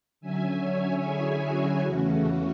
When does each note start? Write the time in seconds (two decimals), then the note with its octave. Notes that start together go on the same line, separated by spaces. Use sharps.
0.21 D3 F#3 C#4 E5 G#5
0.61 C#5 E5
1.01 E4 G#4
1.42 F#4
1.82 E2 C#3 E3 A3 C#4 F#4
2.22 F#4